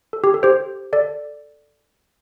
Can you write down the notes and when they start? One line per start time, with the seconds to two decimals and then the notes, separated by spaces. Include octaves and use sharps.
0.13 A4
0.24 G4
0.34 A4
0.43 G4 C5
0.93 A4 D5